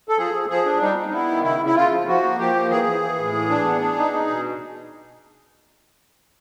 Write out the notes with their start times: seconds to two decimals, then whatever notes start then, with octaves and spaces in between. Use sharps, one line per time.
0.09 A4
0.17 F3 G#4
0.34 F3
0.49 F3 G#4
0.66 D4
0.81 G3 D#4
0.97 D#4
1.09 D#4
1.13 B3 E4
1.28 D#3
1.44 C#3 E4
1.61 C#3 E4
1.76 C#3 F4
1.91 F3
2.08 F3 F#4
2.23 A#3
2.39 F3 G4
2.55 A#3
2.71 E3 G#4
2.86 E3
3.02 E3
3.18 A2
3.34 E3
3.49 D4
3.65 B3
3.82 D4
3.98 D#4
4.13 D#4
4.28 B2